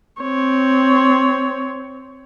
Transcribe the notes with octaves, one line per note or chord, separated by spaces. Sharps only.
C4 C#5